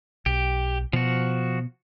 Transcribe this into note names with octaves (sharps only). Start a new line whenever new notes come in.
B1 G4
B2 F3 F#4